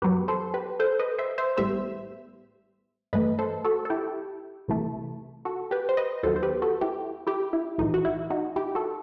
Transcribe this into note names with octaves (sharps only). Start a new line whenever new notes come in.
F#2 F#3 B3 G4 B4
A4 C5
G4 B4
A4 C5
B4 D#5
C5 E5
C5 E5
A1 A2 G3 B3 C5 E5
G2 E3 A3 B4 D#5
A4 C5
F#4 A4
A4
E4 G4
C2 C3 E3 A3
F#4 A4
G4 B4
C5
B4 D#5
D#2 D#3 F#3 B3 A4 C5
C5
G4 B4
F#4 A4
E4 G4
E4 G4
E4
B1 A2 E3 D#4
F#4
E4
D#4 F#4
E4 G4
F#4 A4